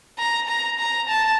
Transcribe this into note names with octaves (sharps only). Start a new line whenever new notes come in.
A#5
A#5
A#5
A5